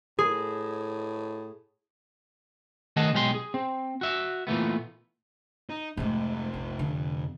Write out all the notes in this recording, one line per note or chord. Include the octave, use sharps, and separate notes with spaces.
A2 G#4
D#3 A3 G#4 D#5 F#5 A5
B1 G#3 G4 F5 C6
G#4
C4
F#4 E5
A#2 E3 A3 B3
D#4
F2 G#2 C3 A3
A#1
D3